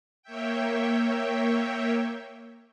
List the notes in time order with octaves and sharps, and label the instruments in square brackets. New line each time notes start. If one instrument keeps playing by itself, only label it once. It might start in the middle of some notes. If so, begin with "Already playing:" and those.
[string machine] A#3 C#5 E5 G5